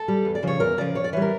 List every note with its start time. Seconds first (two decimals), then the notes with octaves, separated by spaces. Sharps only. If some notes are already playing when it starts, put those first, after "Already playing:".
Already playing: A4
0.08 G3
0.25 E2
0.35 D5
0.43 C#3 F3 C#5
0.60 E2 A#4
0.77 C#3 F3 D5
0.95 F2 C#5
1.04 D5
1.13 E3 C#5
1.17 G3
1.22 A#4